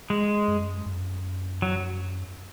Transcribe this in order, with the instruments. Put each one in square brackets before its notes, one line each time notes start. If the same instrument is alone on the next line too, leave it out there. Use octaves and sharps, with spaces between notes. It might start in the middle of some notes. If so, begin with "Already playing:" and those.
[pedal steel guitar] G#3
[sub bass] F#2
F#2
[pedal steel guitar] F#3